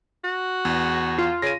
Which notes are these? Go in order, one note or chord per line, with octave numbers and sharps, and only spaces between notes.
F#4
E2
F4
C#3 A#6 D#7